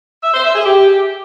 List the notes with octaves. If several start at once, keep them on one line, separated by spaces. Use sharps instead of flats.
E5
C5
E5
G#4
G4